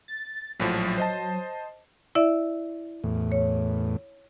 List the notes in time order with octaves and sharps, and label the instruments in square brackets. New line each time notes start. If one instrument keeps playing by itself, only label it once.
[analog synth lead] A6
[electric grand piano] A#1 A2 F3 [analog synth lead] F#3
[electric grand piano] C5 D#5 A5
[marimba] E4 D5 E5
[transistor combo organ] E2 A2
[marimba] C#5